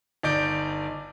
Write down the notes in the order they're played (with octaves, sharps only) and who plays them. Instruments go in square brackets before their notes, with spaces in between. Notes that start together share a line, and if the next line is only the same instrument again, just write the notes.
[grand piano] G1 D#4 D5 G6 D7